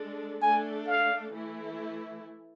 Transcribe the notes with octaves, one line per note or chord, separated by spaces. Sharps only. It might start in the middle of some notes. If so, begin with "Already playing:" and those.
Already playing: G#3 D4 A4
A3 D4 A4 G#5
F5
E3 A3 E4